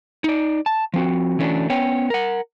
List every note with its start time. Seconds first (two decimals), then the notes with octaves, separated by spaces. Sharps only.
0.24 D#4 D5
0.66 A5
0.94 F3 C4 F#4
1.39 E3 A3 C#4 D4 F#4
1.70 B3 C#4 C#5 G5
2.10 A#4 F#5